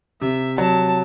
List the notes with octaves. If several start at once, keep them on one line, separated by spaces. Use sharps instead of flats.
C3 E5
F#3 A5